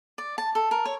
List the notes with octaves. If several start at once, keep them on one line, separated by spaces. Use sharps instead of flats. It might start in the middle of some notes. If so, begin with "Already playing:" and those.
D5
A5
A4
A#4
C#5